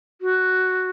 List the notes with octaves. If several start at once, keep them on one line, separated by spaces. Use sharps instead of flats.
F#4